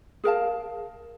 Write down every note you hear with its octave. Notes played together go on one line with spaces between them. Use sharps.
G#4 A#4 F5 A5